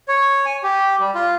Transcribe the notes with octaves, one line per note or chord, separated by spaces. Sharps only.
C#5
G#5
G4
G3
F4